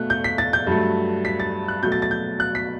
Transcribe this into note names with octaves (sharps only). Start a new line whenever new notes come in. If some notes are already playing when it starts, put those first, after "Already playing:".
Already playing: B2 A3 F#6
G6
B6
A6
G6
G2 F#3 A3
B6
A6
F#6
B2 F#3 A3 G6
A6
A6
G6
F#6
B6